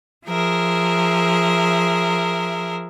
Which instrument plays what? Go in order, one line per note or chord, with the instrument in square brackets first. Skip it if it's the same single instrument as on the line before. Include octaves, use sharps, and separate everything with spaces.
[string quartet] F3 G#4 A#4 E5